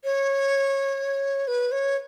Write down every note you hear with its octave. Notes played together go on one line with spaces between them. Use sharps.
C#5
B4
C#5